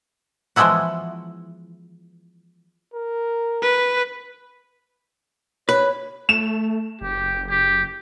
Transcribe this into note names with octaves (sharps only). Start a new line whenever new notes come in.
E3 F3 G#3 B3 E4 F#4
A#4
B4
B4 C#5
A3 E7
F#1 G4
G4